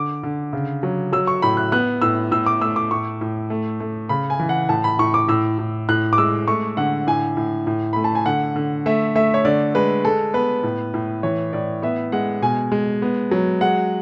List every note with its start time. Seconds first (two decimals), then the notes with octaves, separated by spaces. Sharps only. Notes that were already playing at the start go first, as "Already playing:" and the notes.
Already playing: D3 D6
0.23 D3
0.53 C#3
0.83 F#3
1.13 F#3 E6
1.27 C#6
1.42 A2 B5
1.57 F#6
1.72 B3 F#6
2.02 A2 E6
2.31 A2 E6
2.46 D6
2.61 A3 E6
2.76 D6
2.91 A2 C#6
3.21 A2
3.50 A3
3.80 A3
4.09 C#3 B5
4.30 G#5
4.40 E3
4.49 F#5
4.69 A2 A5
4.84 B5
4.99 A2 C#6
5.14 D6
5.28 A2 E6
5.59 A2
5.89 A2 F#6
6.13 D6
6.18 G#3 E6
6.48 A3 C#6
6.77 D3 F#5
7.07 A2 G#5
7.37 A2
7.67 A2
7.93 A3 B5
8.04 A5
8.15 G#5
8.26 D3 F#5
8.56 D3
8.86 A3 E5
9.15 A3 E5
9.34 C#5
9.45 D3 D5
9.75 G#3 B4
10.04 G#3 A4
10.34 B3 B4
10.63 A2
10.94 A2
11.23 E3 C#5
11.53 A2 D5
11.82 B3 E5
12.12 G#3 F#5
12.42 B2 G#5
12.72 G#3
13.02 B3
13.31 F#3
13.61 G#3 F#5